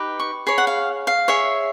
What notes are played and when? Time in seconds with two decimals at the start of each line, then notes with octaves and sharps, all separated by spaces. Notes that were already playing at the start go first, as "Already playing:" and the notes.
Already playing: D#4 G4 B4
0.20 C#6
0.47 G#4 C#5 B5
0.58 F#5
0.67 F5
1.07 F5
1.28 G#4 C#5 E5